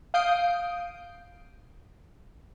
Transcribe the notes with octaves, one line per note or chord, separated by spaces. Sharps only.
F5 D#6 G6 C7 D7